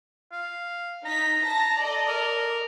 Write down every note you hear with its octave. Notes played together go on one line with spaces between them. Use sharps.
F5
D#4 A#5 B6
A5 A#6
A4 D5 D#5
A#4